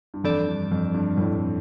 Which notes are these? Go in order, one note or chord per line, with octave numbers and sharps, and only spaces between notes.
G2
F2 E3 G3 D4 A4 D5
G2
F2
G2
F2 A2